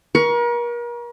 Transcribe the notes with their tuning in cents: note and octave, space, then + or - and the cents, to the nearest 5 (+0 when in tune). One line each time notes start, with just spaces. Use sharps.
A#4 +40 C#6 +15